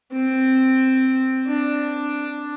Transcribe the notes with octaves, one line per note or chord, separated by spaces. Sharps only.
C4
D4